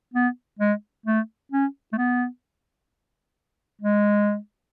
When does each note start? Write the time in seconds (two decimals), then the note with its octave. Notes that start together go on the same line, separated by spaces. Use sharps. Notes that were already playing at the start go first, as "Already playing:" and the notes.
0.14 B3
0.59 G#3
1.06 A3
1.52 C#4
1.92 A3
1.97 B3
3.81 G#3